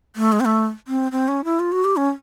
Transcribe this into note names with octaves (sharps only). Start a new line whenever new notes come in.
A3
G#3
C4
A3
C4
C4
C#4
E4
F4
F#4
G4
C#4